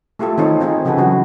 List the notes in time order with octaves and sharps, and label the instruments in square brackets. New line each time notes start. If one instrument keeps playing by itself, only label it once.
[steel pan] A3 E4 F4 G4 A4
D#3 C4 D#4 F4 A4 C#5
C4 D#4 F4 G#4
C#3 F3 F#4 G#4 A4 B4
C#3 E3 F#3 F#4